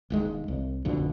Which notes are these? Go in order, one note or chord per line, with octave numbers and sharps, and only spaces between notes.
E1 D#2 G#3
C2
A1 F2 B2 D3